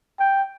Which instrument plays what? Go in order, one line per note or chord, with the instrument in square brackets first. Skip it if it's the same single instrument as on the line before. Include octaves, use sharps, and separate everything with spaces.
[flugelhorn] G5